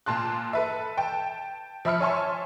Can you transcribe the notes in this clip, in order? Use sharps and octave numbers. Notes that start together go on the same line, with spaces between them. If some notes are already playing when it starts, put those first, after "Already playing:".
A#2 F4 A5 C6 F#6
A4 B4 E5
G5 A5
F3 E5 B5 F6 C#7
C#5 E5 G#5 A5 C6 C#6